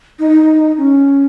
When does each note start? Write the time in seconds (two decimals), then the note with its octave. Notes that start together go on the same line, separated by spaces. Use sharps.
0.19 D#4
0.78 C#4